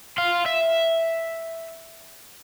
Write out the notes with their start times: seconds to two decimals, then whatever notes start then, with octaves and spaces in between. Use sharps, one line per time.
0.18 F5 C6
0.46 E5